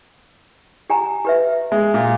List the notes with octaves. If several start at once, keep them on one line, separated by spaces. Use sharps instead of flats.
G4 G#5 A#5
G4 B4 E5
G#3 E5
A#2